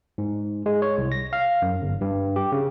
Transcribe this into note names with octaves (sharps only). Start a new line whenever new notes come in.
G#2
G#3
C#5
C2
A#6
F5
F#2
G1
G2
G4
C#3